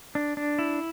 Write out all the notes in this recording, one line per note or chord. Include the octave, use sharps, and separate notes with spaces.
D4
D4
E4